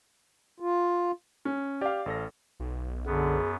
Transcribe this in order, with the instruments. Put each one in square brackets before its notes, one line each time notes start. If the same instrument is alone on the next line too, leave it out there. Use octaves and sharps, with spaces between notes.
[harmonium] F4
[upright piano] C#4
[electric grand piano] G4 [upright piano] D5 F5
[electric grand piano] A1 A4 A#6
[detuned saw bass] B1
[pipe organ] F#2 B3 [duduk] D3 [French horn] G#4